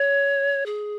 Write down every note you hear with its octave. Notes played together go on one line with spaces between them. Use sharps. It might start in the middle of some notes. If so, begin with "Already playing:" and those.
Already playing: C#5
G#4